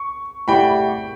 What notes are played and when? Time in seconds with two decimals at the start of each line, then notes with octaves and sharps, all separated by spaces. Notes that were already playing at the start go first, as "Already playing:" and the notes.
Already playing: C#6
0.48 A3 E4 G4 D5 F#5 G5 B5